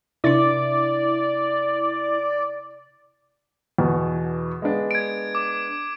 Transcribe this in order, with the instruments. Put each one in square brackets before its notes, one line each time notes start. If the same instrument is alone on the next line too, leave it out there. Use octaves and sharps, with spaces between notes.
[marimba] C3 D4 [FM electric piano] E4 [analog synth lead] D5
[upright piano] E2 B2 F#4
G#3 B3 D4
[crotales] G#6 D7
D6